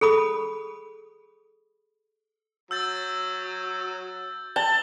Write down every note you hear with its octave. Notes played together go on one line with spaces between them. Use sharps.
G#4 A4 B5 D#6
F#3 E6 G6 A6
A5 F#7 G7